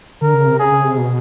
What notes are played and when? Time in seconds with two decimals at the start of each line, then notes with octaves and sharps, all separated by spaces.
0.21 D3 A#4
0.34 C#3
0.47 C3
0.59 C#3 G#4
0.71 C#3
0.84 C3
0.97 B2